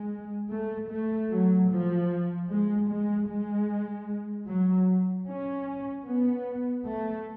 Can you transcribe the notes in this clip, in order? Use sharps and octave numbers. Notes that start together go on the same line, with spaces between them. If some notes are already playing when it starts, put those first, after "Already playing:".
Already playing: G#3
A3
A3
F#3
F3
G#3
G#3
G#3
F#3
C#4
B3
A3